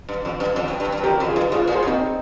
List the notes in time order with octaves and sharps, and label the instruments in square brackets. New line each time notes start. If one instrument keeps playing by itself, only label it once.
[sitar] G2
F2
G2
F2
G2
G2
G2
[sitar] F2 [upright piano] G4 A#4
[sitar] F2
[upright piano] F4 G#4
[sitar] G2
[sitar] G#2 [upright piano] F4 G#4
[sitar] A#2
[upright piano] G#4 C5
[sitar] A#2
[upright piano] C4 D#4